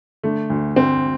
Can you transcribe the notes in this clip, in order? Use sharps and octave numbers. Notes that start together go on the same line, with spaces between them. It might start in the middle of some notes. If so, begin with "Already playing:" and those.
D3 A3
D2
D2 C4